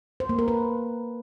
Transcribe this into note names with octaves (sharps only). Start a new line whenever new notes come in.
C5
A#3
A#4
B4